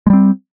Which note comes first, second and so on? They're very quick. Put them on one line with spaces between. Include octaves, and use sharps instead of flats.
G#3 G3 C4